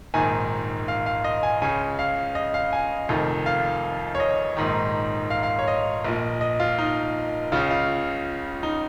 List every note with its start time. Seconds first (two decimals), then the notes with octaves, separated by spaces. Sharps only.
0.14 A#1 G#2 D#3 G#5
0.88 F5
1.06 F5
1.24 D#5
1.43 G#5
1.62 C#2 C#3 G#5
1.99 F5
2.35 D#5
2.54 F5
2.73 G#5
3.09 F1 F2 D#3
3.46 F5
4.15 C#5
4.20 D#5
4.57 A#1 G#2 D#3
5.30 F5
5.43 F5
5.59 C#5
5.68 D#5
6.05 A#1 A#2
6.41 D#5
6.60 F4
6.78 D#4
7.52 C#2 C#3 F4
7.71 F4
8.63 D#4